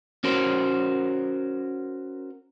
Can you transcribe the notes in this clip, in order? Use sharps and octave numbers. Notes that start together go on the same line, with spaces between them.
C#4 F#4 A#4 C5